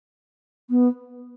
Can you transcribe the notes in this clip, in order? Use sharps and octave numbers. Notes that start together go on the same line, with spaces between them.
B3